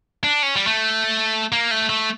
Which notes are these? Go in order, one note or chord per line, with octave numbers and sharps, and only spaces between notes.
D4
C#4
G3
A3
A#3
A3
A3